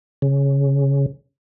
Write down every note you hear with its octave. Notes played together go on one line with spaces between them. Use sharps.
C#3